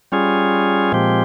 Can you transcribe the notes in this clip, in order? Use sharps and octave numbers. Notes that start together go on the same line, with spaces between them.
G3 C#4 F4 G#4
A#2 F3 G#3 C4 G4